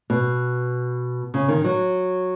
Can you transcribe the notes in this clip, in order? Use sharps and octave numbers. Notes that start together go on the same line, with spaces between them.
B2
C#3
D#3
F#3